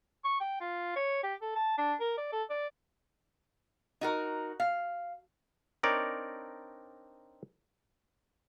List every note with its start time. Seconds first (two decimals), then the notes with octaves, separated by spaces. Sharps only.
0.24 C#6
0.40 G5
0.61 F4
0.96 C#5
1.23 G4
1.41 A4
1.56 A5
1.78 D4
2.00 A#4
2.18 D5
2.32 A4
2.50 D5
4.01 D#4 F#4 A#4
4.60 F5
5.83 C4 D4 D#4 A#4 C#5 D5